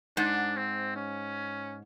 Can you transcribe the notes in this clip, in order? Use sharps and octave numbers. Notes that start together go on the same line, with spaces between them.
G#2 D4
C4
C#4